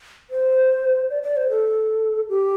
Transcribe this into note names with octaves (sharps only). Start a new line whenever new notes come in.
C5
D5
D5
C5
A4
G4